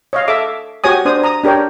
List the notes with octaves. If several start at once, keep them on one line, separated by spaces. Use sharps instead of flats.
C#5 D#5 F5
A4 E5 D6 E6
F#4 G4 C#5 G#5 D#6
D4 C5 D#6
A#5 D#6
D4 G4 A#4 C#5 G5